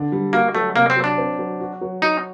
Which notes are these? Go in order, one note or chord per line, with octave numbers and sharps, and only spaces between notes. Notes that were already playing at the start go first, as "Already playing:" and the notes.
Already playing: D3 D4
G3
A#3 F#4
F#3 A3
C3 A#3
C4
F#3
D4
C4
F#3
F#4
F#3
D#4 F#4